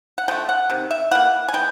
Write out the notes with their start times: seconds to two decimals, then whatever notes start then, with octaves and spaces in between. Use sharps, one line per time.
0.18 F#5
0.28 D3 F3 A3 G5
0.49 F#5
0.70 C3 D#3
0.91 E5
1.11 E3 G3 A#3 F#5
1.48 G#5
1.53 E3 G#3 B3 G5